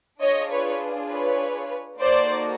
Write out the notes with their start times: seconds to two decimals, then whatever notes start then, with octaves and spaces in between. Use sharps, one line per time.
0.21 D4 F4 G#4 C#5 D#5
0.51 B4 C#5
1.10 B4 C#5
1.98 A#3 D#4 F#4 A4 C5 D5